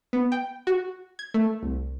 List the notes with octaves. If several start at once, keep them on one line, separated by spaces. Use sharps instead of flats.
B3
G5
F#4
G#6
A3
C2